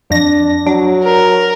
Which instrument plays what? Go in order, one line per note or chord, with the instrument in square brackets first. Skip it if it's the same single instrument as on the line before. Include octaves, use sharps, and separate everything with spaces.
[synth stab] F2 A#6 [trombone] D4
[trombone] F#3 [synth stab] D4
[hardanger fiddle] A#4